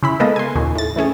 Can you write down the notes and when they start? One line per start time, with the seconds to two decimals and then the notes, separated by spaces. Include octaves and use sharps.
0.03 C#3 E4 B5
0.20 G#3 A#3 B3 A4 B4 D#5
0.36 G#5 C6
0.55 D#2 A#2 C#3
0.75 A2 A6
0.96 E3 A3 C#4 G#4